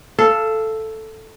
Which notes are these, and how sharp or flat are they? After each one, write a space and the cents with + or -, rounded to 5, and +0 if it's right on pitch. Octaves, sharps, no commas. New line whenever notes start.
A4 +0 F5 -25